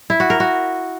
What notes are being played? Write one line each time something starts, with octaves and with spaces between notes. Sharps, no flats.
E4
F#4
A#4
F#4